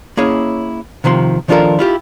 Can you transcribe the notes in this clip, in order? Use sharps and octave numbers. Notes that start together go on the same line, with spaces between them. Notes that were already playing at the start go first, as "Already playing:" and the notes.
A#3 C#4 E4 G#4 C#5 D#5
C3 D#3 F3 B4 C6
D#3 F3 D4 F4 A4 A#4
E4 F4 G4